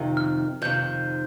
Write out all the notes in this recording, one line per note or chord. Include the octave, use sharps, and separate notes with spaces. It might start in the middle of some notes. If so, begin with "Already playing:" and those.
Already playing: F2 C3 D#3
F6
F2 C3 D#3 G6